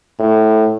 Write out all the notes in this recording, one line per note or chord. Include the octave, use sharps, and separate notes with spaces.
A2